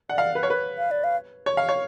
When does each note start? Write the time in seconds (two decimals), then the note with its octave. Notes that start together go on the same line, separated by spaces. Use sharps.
0.09 D5 F#5
0.18 F5
0.35 B4
0.43 C#5
0.50 B4
0.78 F5
0.91 D5
1.04 F5
1.46 C#5
1.57 F5
1.69 C#5